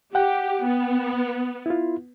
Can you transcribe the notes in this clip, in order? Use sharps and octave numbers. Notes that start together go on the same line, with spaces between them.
G4 F#5 G5
B3
E4 F4